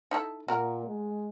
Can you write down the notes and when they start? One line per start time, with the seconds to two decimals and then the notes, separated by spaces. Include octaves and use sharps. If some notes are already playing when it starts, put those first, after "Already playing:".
0.11 D#4 E4 A4
0.48 A#2 F#4 A#4
0.86 G#3